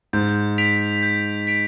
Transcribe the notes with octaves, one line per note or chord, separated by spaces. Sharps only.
G#2 G6
B6 D7 F7
G6
B6 D7 F7